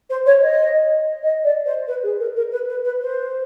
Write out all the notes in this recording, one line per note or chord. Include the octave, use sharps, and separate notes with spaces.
C5
C#5
D#5
D#5
D5
C5
B4
G#4
A#4
A#4
B4
B4
B4
C5